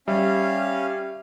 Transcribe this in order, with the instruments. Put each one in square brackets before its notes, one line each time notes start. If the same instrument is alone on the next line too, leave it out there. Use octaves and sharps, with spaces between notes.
[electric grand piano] G3 [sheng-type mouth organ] C#4 F5 [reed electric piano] E5